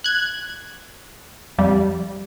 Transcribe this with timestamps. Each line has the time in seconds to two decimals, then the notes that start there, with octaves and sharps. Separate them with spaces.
0.04 F#6 G#6
1.58 F2 G3